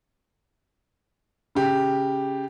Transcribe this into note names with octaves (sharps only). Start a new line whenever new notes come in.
C#3 G4